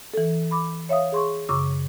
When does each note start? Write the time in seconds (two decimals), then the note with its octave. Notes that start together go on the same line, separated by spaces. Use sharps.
0.14 E3 A4
0.51 B5 D6
0.89 C#5 E5 F5 D#6
1.12 G#4 C6 C#6
1.49 F#2 C#3 C#6 D6 E6